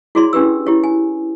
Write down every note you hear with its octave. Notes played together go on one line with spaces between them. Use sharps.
E4 F#4 G#4 C#5 D5 C6
C#4 D4 G4 B4 E6
E4 G4 C#5
G#5